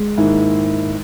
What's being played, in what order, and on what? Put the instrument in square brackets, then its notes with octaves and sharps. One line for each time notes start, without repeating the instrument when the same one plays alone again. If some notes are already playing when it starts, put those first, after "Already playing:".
Already playing: [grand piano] G#3
[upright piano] G#2 D#3 A#3 E4